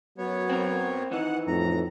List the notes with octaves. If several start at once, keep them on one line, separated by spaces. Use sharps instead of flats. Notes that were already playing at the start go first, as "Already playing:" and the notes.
F#2 F#3 B3 C#5
C4 A#4
D#3 E3 D#4 F#5
F2 A2 A#5